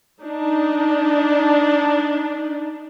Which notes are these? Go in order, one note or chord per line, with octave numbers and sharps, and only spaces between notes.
D4 D#4